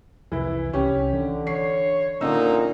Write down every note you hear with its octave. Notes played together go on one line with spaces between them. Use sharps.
C2 F2 E3 E4
C2 C#4 G4
D3 E3
C#5 C7
A#2 D3 B3 C#4 D#4 E6